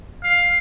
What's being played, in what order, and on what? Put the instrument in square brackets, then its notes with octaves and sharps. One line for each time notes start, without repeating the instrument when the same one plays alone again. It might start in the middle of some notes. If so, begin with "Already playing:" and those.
[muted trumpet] F5